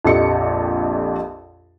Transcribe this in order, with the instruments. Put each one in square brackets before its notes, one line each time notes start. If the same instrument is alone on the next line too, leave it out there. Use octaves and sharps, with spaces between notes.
[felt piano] A#1 F2 G4 A4 D#5 C#7